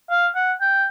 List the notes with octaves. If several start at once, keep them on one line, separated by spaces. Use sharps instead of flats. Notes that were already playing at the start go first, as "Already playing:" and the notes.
F5
F#5
G5